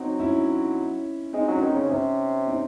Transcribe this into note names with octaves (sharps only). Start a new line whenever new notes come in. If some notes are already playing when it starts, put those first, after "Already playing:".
Already playing: F#3 C4 D#4
C#4 E4
G#3 C4 D#4
F#3 C#4
D#3
C#3 C4
C3 C#4
C4 D#4